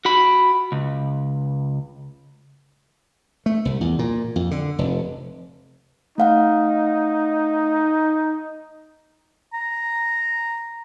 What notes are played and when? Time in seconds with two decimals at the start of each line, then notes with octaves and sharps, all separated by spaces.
0.05 F#4 B5
0.72 C#2
3.46 A3
3.65 C2
3.81 E2
3.99 A#2
4.36 F2
4.51 D3
4.79 F1
6.18 A3 D#4 F5 F#5
9.53 A#5